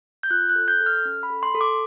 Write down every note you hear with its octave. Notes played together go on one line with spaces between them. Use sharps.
G6
F4 F#6
F#6
A4
G6
A4
F6
C#4
B5
A4
C6
A4
D6